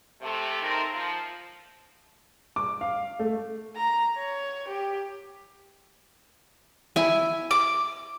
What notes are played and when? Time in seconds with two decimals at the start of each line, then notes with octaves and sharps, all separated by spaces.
0.21 C3 A3
0.62 G#3 A3 C4 D#4 A#4
0.93 F3
2.56 D6
2.81 F5
3.19 A3
3.76 A#5
4.17 C#5
4.68 G4
6.96 E4 G#5
7.51 D6